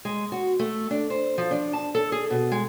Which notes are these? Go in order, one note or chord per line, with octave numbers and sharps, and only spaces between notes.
G#3
F#4
A3
D4
C5
F3
D4
A5
A4
G#4
B2
G#3